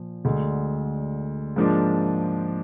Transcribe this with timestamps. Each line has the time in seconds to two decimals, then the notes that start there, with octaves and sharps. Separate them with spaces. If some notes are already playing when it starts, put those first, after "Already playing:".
Already playing: A#2 F3
0.25 D2 D3 G#3
1.56 G#2 F3 A#3 D4